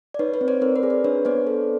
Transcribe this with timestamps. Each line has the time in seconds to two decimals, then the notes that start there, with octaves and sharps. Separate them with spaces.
0.14 D5
0.19 D#4 B4 C#5
0.34 B4 C#5
0.41 C4
0.48 C5 D5
0.61 C4 A#4 C5
0.76 B4
0.83 G#4
0.90 B4
1.04 D4 B4 C#5
1.25 B3 C5 D5
1.47 A4